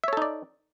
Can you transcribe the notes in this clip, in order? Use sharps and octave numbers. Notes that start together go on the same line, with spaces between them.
D#4 A4 C#5 D5 E5